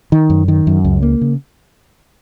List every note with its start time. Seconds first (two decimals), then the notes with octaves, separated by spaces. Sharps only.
0.12 D#3
0.30 F#2
0.48 D#3
0.67 F#2
0.84 C#2
1.03 A#3
1.21 C#3